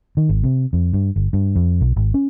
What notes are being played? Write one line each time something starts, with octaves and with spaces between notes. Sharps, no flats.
D#3
G#1
C3
F2
G2
G1
G2
F2
B1
G#1
C#4